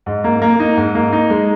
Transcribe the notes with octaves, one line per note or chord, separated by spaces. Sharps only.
G#2
A#3
A#3
D#4
G#2
A#3
D#4
G#3